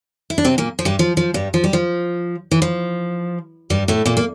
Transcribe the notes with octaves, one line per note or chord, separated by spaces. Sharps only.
E4
D4
C3 C4
A#2 A#3
F3
G2 G3
F3
F3
G2 G3
F3
G3
F3
E3
F3
G2 G3
A2 A3
A#2 A#3
A#3